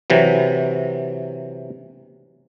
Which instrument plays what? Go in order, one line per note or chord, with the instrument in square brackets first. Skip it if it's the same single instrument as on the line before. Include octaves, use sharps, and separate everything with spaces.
[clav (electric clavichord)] C3 E3 F#3